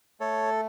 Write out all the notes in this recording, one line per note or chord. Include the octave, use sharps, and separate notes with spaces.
A3 A4 C#5